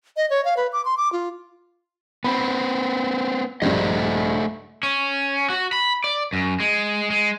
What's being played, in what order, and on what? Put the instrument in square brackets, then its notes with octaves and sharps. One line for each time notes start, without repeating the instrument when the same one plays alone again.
[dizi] D#5
C#5
F5
B4
D6
C6
D6
F4
[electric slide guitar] B3 C4 [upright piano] B5
[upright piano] A#1 G2 [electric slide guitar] A3 C5 D#5
[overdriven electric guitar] C#4
F#4
B5
D5
F#2
G#3
G#3